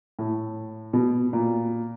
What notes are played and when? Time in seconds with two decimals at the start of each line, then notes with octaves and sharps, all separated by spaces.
0.19 A2
0.93 B2
1.33 A#2